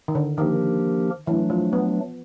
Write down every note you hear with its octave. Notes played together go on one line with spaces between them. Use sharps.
D#3
D3
D#3 F3 A#3 D4 G4 A#4
E3 F#3 A3 D4
F3
B3